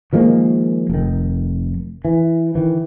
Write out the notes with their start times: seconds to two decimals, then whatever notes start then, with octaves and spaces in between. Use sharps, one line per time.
0.13 D#3 F3 G#3 A#3
0.90 F1 D#3
2.05 E3
2.55 D#3 E3